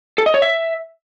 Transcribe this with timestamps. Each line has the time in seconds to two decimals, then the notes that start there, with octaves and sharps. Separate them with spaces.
0.18 A4
0.26 D#5
0.34 C#5
0.42 E5